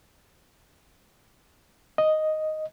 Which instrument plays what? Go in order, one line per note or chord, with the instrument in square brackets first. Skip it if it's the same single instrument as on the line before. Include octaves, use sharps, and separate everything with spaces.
[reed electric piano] D#5